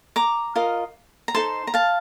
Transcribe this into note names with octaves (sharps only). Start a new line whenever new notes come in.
A#5 D6
F4 A#4 D#5
A#5
D#4 A4 C5 A5 C6
A#5
F5 A5